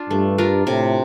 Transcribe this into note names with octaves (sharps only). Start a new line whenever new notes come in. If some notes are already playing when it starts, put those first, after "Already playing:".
Already playing: D4 F4
G2 A3
D4 F4 A#4
A2 C3